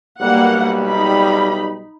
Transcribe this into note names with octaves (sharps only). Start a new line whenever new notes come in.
B1 G3 A#3 F#5
D#4 B5